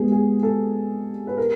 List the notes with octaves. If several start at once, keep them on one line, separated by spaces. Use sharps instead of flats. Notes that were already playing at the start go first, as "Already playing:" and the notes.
Already playing: G#3 B3 G4 G#4
G#4
A4
B4
A#4